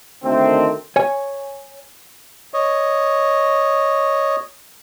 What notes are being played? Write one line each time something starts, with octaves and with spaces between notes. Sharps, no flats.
D2 D#3 A3 C4
C#5 G#5
C#5 D#5